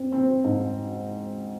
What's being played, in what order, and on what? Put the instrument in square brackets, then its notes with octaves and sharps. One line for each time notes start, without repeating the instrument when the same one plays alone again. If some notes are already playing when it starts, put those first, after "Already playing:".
Already playing: [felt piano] C4
C4
G#2